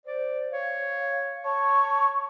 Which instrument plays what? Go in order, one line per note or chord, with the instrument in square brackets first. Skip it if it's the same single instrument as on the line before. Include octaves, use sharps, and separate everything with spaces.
[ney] C5 [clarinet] D5
[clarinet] C#5 [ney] F5
[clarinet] C#5 [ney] A5 [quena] C#6